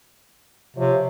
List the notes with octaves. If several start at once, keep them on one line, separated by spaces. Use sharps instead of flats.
C3 F3 C#5